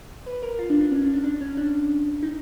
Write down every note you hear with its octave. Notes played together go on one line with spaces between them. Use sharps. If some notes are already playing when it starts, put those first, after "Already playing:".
B4
A#4
F4
D4
D4
C#4
D4
D4
D4
C#4
D4
D#4